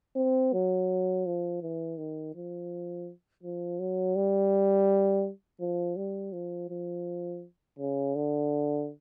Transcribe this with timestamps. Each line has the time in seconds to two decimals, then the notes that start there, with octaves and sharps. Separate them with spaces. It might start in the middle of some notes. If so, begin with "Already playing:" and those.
0.16 C4
0.53 F#3
1.26 F3
1.62 E3
1.98 D#3
2.35 F3
3.44 F3
3.79 F#3
4.16 G3
5.60 F3
5.96 G3
6.33 F3
6.70 F3
7.79 C#3
8.15 D3